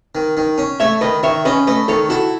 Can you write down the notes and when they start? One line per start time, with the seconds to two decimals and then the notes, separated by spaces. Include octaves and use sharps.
0.15 D#3
0.37 D#3
0.58 C#4
0.80 A3 C#5 E5
1.01 D#3 B4 D#5
1.23 D#3 C#5 E5
1.45 C#4 B4 D#5
1.67 A3 B4 D#5
1.88 D#3 A4 C#5
2.10 E4 F#4 A4